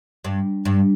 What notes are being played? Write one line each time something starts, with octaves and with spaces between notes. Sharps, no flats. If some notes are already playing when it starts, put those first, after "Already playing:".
G2
G2